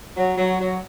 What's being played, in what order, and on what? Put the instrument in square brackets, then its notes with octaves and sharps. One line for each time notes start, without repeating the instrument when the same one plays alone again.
[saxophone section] F#3
F#3
F#3